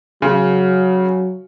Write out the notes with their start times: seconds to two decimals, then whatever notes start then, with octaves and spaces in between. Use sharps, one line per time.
0.22 C#3 F#3